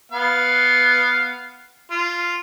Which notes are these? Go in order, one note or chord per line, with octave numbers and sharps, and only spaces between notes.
B3 F5
F4